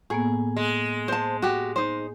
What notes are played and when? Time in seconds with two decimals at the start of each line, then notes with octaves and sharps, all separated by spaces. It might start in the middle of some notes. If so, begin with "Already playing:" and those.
0.10 A2 A#3 B3 G#4
0.57 G#3
1.08 C5 A5
1.42 F#4 G4
1.76 D#4 C5